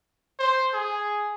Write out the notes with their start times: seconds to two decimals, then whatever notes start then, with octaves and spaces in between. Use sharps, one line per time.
0.39 C5
0.74 G#4